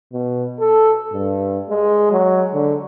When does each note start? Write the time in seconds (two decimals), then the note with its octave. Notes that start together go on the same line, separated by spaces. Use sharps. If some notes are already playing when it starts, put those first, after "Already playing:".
0.13 B2
0.60 A4
1.13 G2
1.70 G#3
2.12 F#3
2.54 D3